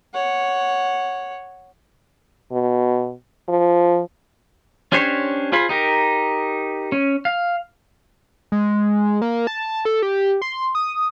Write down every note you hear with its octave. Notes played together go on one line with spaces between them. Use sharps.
C#5 F#5
B2
F3
C#4 D4 G4 C5 C#5
F4 G#4 C5 B5
D#4 G4 A#4
C#4
F5
G#3
A#3
A5
A4
G4
C6
D#6